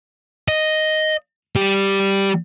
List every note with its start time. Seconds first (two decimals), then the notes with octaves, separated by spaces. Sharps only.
0.48 D#5
1.56 G3 G4